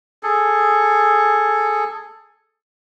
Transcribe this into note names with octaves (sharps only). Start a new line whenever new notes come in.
G#4 A4